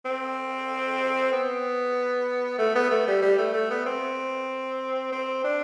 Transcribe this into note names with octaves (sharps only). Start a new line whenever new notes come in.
C4
B3
A3
B3
A3
G3
G3
A3
A3
B3
C4
C4
D4